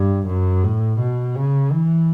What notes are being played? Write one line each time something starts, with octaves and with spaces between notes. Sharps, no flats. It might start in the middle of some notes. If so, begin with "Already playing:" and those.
Already playing: G2
F#2
A2
B2
C#3
E3